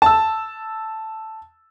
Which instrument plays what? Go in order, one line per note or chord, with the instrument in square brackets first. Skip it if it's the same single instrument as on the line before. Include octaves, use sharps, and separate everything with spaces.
[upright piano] A5 E6